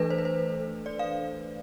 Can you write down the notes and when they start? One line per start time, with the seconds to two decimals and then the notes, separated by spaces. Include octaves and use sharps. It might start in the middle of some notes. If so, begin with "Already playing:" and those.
Already playing: E3 A3 D4 A4 B4
0.10 C5
0.18 B4
0.25 C5
0.86 D5
0.99 F5